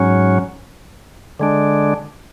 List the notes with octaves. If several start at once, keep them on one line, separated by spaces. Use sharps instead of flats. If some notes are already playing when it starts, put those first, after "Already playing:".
Already playing: G#2 F#3 C#4
D3 G#3 D4